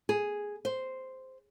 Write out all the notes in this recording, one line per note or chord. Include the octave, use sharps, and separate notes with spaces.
G#4
C5